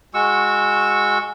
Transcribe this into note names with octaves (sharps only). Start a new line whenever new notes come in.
G#3 F#4 C#6 E6